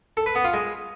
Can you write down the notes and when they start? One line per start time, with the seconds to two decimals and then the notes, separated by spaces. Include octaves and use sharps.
0.17 A4
0.26 B4
0.35 B3
0.45 F4
0.54 G#3